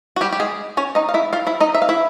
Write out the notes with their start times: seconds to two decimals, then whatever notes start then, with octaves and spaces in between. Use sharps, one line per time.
0.16 F#4
0.21 G3 G4
0.32 G4
0.40 G#3 G#4
0.77 C#4 C#5
0.95 D#4 D#5
1.09 F5
1.14 E4 E5
1.33 F4 F5
1.47 E4 E5
1.60 D#4 D#5
1.74 E5
1.82 F5
1.89 E4 E5